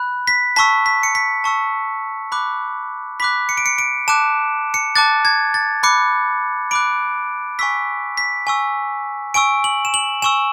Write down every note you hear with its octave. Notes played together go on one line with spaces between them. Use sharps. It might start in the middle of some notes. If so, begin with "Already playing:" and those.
Already playing: B5 F#6
B6
A5 C#6 E6 B6
B6
C#7
B6
A5 C#6 E6
B5 D6 F#6
B5 D6 F#6 B6
C#7
D7
C#7
D7
A5 D6 F#6 E7
C#7
A5 D6 F#6 A6
G#6
A6
B5 D6 F#6 C#7
B5 D6 F#6 D7
G#5 C#6 E6 B6
B6
G#5 C#6 E6
G#5 C#6 E6 D7
F#7
E7
F#7
G#5 C#6 E6 E7